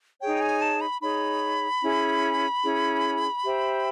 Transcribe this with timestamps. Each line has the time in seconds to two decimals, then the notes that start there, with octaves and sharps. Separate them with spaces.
0.20 D#4 G#4 C#5 G5
0.41 G#5
0.62 A5
0.81 B5
1.02 D#4 G#4 C#5 B5
1.82 C#4 E4 G#4
2.63 C#4 E4 G#4
3.44 G4 C5 E5 G5